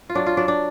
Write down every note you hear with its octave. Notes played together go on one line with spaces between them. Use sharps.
F4
F#3 D4
F4
F#3 D4
D4